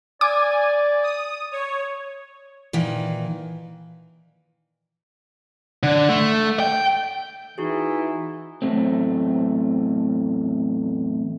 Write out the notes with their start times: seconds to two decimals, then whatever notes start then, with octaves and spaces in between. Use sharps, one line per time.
0.21 D5 G#5 D6
1.03 D#6
1.52 C#5
2.73 A#2 D#3 E3
5.83 D3
6.09 A3
6.60 G5
7.58 E3 D#4 F#4 G#4
8.62 E2 A2 F3 F#3 A3 C4